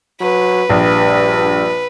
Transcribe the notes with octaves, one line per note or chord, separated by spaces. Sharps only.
F#3 B4
A#1 G2